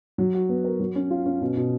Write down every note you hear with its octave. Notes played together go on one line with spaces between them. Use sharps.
F#3
F#4
B3
A#4
F#3
C#4
F4
C#4
B2
B2